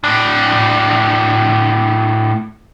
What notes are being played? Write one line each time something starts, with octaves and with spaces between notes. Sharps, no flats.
A2 D4